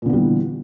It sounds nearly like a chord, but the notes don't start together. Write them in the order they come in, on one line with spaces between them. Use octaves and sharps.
A#2 D3 B3 G3 E3